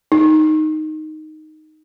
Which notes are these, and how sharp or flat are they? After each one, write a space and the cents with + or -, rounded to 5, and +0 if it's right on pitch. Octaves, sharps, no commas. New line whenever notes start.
D#4 +0